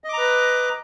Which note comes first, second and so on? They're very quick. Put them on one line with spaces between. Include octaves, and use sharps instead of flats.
D#5 D6 A#5 B4